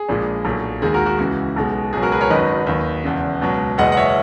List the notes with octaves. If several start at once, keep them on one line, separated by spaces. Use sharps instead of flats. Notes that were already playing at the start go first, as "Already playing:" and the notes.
Already playing: G#4
A#1 A#2 G#3
B1 A#2 F#3
D#2 D#3 G#3 G#4
F#4 A#4
F#4
C#2 C#3 E3 F#4
B1 B2 G#3
C#2 B2 F#3 G#4
F#4 A#4
G#4 B4
A#4 C#5
G#1 F#2 D#3 F#3 B4 D#5
D#2 D#3 F#3
E1 E2 C#3
C#2 B2 F#3
F#1 E2 B2 G#3 D#5 F#5
F#5
C#5 E5